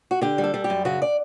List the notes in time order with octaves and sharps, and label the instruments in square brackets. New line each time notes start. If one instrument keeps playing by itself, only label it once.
[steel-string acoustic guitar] F#4
D3 G4
G3
A4
G3
G4
F#2
C#3 F#4
D5